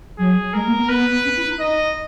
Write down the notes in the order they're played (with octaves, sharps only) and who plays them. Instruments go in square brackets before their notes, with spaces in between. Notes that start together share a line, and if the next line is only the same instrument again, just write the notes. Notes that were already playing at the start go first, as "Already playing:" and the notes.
[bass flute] F#3 [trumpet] G#4
[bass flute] G#3 [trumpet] A#4
[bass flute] A#3
B3
[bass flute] B3 [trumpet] B4
[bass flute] C#4
E4
D#4
[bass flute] D#4 [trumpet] D#5